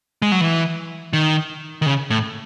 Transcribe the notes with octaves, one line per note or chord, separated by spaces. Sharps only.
G#3
F#3
E3
D#3
D#3
C#3
A2